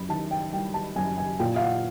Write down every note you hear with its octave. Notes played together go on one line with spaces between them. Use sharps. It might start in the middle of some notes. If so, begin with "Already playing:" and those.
Already playing: F#2 B5
D#3 A5
G5
G3 G5
A5
F#2 G#5
G#5
A#2 G5
F5
F#5